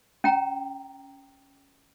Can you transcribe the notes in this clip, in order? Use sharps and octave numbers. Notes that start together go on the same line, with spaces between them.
C#4 G5 A#5